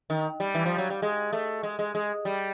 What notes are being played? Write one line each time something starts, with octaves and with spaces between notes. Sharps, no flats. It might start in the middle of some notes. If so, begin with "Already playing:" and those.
D#3
G3
E3
F3
F#3
G3
G#3
A3
G#3
G#3
G#3
G3